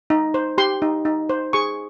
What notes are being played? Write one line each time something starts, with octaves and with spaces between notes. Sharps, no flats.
D#4
C5
G4 C6
D#4
D#4
C5
G#4 C#6